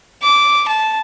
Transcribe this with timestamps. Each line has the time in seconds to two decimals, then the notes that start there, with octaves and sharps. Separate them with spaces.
0.23 D6
0.68 A5